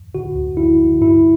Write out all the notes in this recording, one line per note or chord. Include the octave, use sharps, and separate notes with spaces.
D3 F#4
D2
D3 E4
D3
G2 E4